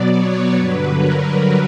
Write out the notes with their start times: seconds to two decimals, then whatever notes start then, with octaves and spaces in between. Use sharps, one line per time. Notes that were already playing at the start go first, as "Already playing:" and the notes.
Already playing: B2 F#3 B3 D5
0.15 C#5
0.56 G2 D3 F#3 B4
0.98 A#4